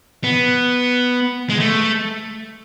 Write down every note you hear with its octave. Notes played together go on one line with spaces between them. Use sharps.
B3
G#3
A3